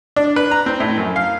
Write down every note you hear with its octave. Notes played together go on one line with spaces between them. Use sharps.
D4
B4
A#5
C4
A2
F#2
F5